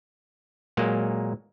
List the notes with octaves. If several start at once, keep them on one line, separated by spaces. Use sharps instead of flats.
A#2 F#3 G#3 A#3